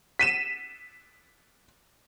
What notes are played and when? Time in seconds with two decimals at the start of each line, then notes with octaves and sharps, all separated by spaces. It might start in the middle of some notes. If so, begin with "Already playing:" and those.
0.19 B6 D#7 E7